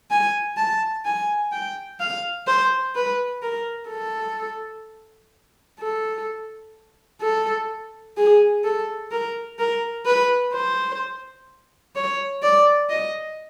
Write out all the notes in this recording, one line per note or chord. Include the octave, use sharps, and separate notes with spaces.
G#5
A5
G#5
G5
F5
C5
B4
A#4
A4
A4
A4
G#4
A4
A#4
A#4
B4
C5
C#5
D5
D#5